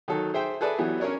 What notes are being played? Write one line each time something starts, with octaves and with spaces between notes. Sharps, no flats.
D#3 F#3 A4
G#4 C5 E5 G5
G#4 A4 B4 D5 E5 B5
E3 F#3 B3 G4
C#4 D4 A#4 C#5 D5